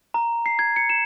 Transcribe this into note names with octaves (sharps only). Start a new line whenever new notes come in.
A#5
C7
G#6
C#7
E7